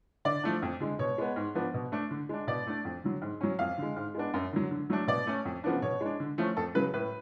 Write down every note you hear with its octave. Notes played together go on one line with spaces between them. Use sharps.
D3 D5
F3 A3 D4
F2
D3 G#3
B2 C#5
G#3 B3
G#2
F3 B3 D4
B2
A3 D4
D3
G#3 D4
B2 D5
A3 D4
F2
D3 F#3
G#2
F#3 C#4
F2 F5
D3 G#3
G#2
G#3 B3 D4
F#2
D3 F#3
D3
F#3 A3 D4
B2 D5
A3 C#4
F2
C#3 F3 B3 D4
B2 C#5
G#3 D4
D3
F3 A3 C#4
F2 A4
C#3 F#3 B4
A2 B4